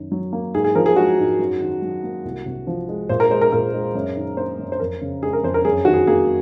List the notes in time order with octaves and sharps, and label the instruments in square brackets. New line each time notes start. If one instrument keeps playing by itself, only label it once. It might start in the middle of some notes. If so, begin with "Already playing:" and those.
Already playing: [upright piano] F#2 D#3
F#3
A#3
G#2 G#4
G#4
F3 A#4
G#4
G#3 F#4
G#2
F#2
D#3
F#3
A#3
C2
C3
F3
G#3
A#2 C5
A#4
G#3 C5
A#4
A#2 A#4
G#3
F#2
D#3
A#3 C5
F#2
C5
F2 A#4
C#3
G#3 G#4
A#4
F2 C5
A#4
F#2 G#4
D#3 F#4
G#4
A#3 G#4